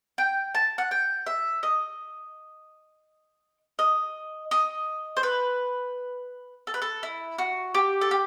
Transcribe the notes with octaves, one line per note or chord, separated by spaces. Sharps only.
G5
A5
F#5
G5
E5
D#5
D#5
D#5
C5
B4
A4
B4
A4
E4
F#4
G4
A4
G4